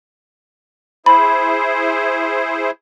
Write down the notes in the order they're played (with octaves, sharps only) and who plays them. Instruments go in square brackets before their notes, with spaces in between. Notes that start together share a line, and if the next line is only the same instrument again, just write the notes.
[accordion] E4 G#4 C5 [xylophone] B5